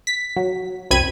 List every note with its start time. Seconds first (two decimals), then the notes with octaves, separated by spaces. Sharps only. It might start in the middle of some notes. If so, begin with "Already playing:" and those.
0.07 B6
0.37 F#3
0.91 C2 F#2 C4 B5 G#6 D#7